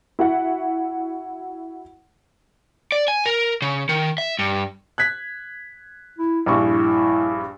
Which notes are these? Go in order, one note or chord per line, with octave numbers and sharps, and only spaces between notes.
E4 F#4 E5 F#5
D5
G#5
A#4
C#3
D#3
E5
G2
F#6 G#6 B6
E4
A#1 G2 E4 C#6